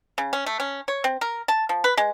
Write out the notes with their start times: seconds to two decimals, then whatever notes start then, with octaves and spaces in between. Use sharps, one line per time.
0.18 C#3
0.33 C#4
0.46 A3
0.60 C#4
0.88 C#5
1.04 C4
1.21 A#4
1.48 A5
1.69 F3
1.84 B4
1.97 G#3